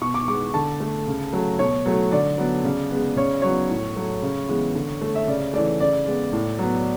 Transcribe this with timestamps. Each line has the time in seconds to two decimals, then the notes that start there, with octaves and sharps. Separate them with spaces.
0.01 B2 C#6
0.14 D6
0.28 G#3 B3 D6
0.54 D3 A5
0.80 A3
1.07 C#3
1.33 F#3 A3
1.59 B2 C#5
1.86 F#3 A3
2.12 D3 D5
2.38 F#3 B3
2.64 C#3
2.91 G#3 B3
3.17 C#3 C#5
3.42 F#3 B3 C#5
3.70 A2
3.96 F#3 A3
4.22 C#3
4.48 E3 G#3 B3
4.75 D3
5.01 A3
5.15 E5
5.27 C#3 D5
5.53 E3 A3 D5
5.80 C#3 D5
6.06 G#3 B3
6.33 A2
6.59 F#3 B3